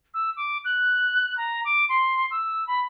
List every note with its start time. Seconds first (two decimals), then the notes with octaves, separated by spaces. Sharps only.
0.14 E6
0.36 D6
0.64 F#6
1.37 A#5
1.64 D6
1.89 C6
2.31 E6
2.67 B5